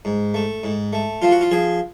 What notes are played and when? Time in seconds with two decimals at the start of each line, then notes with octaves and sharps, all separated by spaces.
0.05 G#2
0.34 A3
0.64 G#2
0.93 A3
1.22 F3 F4
1.31 F#4
1.41 F4
1.51 F3 G#4